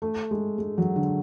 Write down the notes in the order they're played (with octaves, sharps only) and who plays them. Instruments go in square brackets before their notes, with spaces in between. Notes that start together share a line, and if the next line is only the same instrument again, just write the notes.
[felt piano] A3
G#3
G#3
F#3
D3